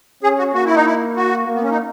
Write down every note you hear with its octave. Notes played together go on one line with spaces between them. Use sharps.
C#4 G#4
F#4
A#3 F#4
E4
D#4
E4
F#4
A#3
B3
C#4
D#4